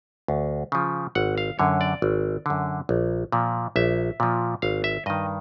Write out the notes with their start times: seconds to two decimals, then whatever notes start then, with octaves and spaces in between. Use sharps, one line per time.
0.28 D2
0.72 C#3 F3
1.15 G#1 F#5
1.38 F5
1.59 F#2 D3 C#5
1.81 D5
2.02 G#1
2.46 F#2 D3
2.89 A#1
3.32 A#2 F3
3.76 A#1 E5
4.20 A#2 F3
4.62 G#1 F5
4.84 E5
5.06 G2 D#3 D#5